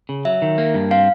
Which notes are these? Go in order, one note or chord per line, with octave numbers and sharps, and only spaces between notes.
C#3
F#3 E5
D#3
A#3
G2
C4 F5